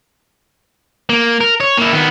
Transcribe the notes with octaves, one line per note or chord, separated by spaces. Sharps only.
A#3
A#4
C#5
A#3 E4
D#3 B3